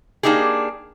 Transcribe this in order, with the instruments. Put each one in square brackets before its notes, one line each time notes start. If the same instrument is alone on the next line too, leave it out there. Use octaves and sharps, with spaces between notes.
[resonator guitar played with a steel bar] A#3 D4 D#4 G4 G#4